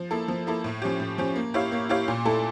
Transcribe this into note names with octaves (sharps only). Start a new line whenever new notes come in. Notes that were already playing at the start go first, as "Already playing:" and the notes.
Already playing: F3
A#3 E4 A4
F3
A#3 E4 A4
A2
F3 C#4 G4
A2
F3 C#4 G4
A#3
E4 G4 C#5 F5
A#3
E4 G4 C#5 F5
A#2
A3 E4 A4